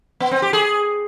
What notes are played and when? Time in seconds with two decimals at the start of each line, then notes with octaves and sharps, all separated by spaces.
0.20 B3
0.31 C4
0.42 G4
0.53 G#4